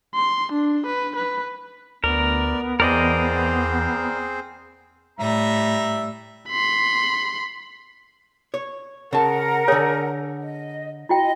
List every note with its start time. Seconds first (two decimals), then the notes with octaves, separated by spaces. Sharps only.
0.15 C6
0.52 D4
0.86 B4
1.16 B4
2.04 D2 B3 A#4 D5
2.80 E2 C4 G#4 A#4 C5 D5 D#5
5.19 A2 G3 E5 A#5
6.49 B5 C6
8.54 C#5
9.13 C#3 A#4 F#5 A5
9.68 D3 G#4 C#5
10.39 D#5
11.09 E4 F#4 D#5 G5